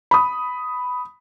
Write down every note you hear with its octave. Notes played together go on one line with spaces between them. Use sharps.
B5 D#6